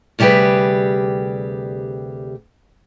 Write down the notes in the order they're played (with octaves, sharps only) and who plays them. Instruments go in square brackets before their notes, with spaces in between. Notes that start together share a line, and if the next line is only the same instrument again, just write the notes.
[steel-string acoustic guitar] D2 C3 G3 G4 G#4 B4